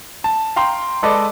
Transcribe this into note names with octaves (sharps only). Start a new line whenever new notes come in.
A5
F5 G5 A#5 C6
G#3 A4 B4 D5 D#5